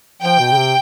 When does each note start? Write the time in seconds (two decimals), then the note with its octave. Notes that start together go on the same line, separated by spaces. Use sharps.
0.22 F3 G5
0.39 B2
0.52 C#3
0.56 C3